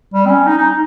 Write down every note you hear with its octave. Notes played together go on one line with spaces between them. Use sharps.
G3
C4
C#4
D#4
D#4